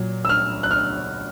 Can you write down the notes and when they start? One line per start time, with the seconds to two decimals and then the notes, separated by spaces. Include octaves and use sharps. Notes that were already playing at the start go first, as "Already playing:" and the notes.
Already playing: A#2 F#3
0.25 E6
0.29 F6
0.63 F#6
0.71 F6